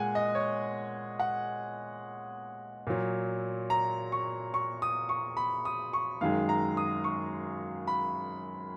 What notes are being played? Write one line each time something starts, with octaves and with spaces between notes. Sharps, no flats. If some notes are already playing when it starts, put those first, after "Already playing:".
Already playing: A#2 G#3 F#5 G#5
D#5
C#5
F#5
A#2 F#3
A#5
C#6
C#6
D#6
C#6
B5
D#6
C#6
F#2 D#3 G#3 F5
A#5
D#6
C#6
B5